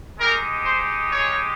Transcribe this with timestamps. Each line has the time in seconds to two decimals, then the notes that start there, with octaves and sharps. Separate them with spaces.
0.19 G#3 D#4 G4 A#4
0.64 C5
1.09 C#5